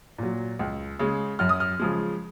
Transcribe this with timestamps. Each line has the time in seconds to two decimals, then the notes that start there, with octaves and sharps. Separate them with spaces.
0.18 A#2 F#3
0.59 C#2
0.99 C#3 G#3
1.39 F#2 F6
1.49 D#6
1.60 F6
1.80 C#3 F3 G#3